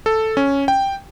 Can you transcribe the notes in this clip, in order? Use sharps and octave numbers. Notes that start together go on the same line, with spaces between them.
A4
C#4
G5